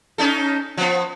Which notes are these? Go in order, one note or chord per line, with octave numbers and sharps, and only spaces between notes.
C#4 D#4 A4
F3 B3